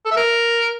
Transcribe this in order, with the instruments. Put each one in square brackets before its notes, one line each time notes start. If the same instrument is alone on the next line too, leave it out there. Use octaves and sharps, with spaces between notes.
[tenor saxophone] A4
E5
A#4